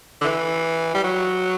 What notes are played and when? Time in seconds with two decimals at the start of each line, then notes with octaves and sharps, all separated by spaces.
0.21 D3
0.24 E3
0.95 G3
1.04 F#3